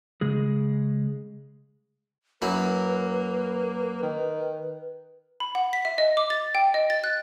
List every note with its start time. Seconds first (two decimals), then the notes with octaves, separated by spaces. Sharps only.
0.21 C#3 G#3 G#4
2.42 F#2 A#3 E4 B4 B5
4.03 D#3
5.40 B5
5.55 F#5
5.73 B6
5.85 E5
5.98 D#5
6.17 D6
6.30 A6
6.55 G5
6.74 D#5
6.90 A6
7.04 F#6